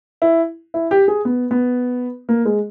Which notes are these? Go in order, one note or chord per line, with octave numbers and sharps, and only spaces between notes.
E4
E4
G4
G#4
B3
B3
A#3
G#3